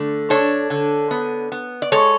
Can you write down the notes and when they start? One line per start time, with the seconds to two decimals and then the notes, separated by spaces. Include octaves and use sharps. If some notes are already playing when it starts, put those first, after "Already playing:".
Already playing: D3 A3
0.30 D4 A4 C#5
0.70 D3
1.11 B3
1.52 B3
1.82 D5
1.92 G#3 A4 C#5